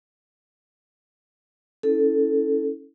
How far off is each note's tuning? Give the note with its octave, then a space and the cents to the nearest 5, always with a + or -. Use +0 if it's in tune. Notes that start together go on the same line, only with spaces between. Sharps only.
C#4 +0 E4 -25 A4 +0